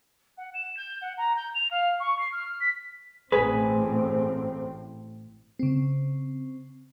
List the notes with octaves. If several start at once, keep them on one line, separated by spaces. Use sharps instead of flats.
F#5
E7
G6
F#5
A#5
G6
F7
F5
C#6
C7
F6
B6
A1 A2 C4 G#4 B4
C#3 C4